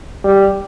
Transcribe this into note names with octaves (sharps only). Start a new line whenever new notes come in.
G3